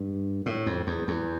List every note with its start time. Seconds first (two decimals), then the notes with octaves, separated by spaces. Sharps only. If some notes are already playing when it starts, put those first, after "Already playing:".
Already playing: G2
0.46 A2
0.66 F2
0.87 E2
1.08 E2